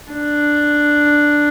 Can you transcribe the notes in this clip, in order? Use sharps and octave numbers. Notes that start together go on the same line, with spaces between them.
D4